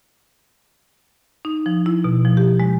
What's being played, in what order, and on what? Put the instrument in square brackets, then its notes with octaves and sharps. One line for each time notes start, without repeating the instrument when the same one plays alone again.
[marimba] D#4
F3
E4
B2
F3
G4
G#3